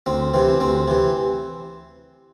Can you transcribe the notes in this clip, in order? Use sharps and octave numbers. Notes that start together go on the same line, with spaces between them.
D2 C4
C3 E3 C4
D2 C4
C3 E3